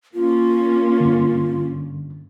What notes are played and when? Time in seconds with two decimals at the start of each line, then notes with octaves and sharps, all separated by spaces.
0.14 A#3 C#4 F4
1.00 G2 D3